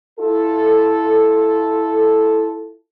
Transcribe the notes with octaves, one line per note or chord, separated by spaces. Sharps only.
E4 F4 A4